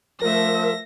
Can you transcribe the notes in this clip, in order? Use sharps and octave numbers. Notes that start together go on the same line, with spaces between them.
F3 A3 A#4 E5 A#6